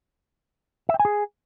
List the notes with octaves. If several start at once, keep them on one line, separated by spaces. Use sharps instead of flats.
E5
G5
G#5
G#4